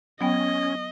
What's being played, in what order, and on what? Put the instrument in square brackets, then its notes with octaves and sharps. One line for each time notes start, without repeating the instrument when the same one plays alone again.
[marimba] F#3 B3 G5 [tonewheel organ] C#4 [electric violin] D#5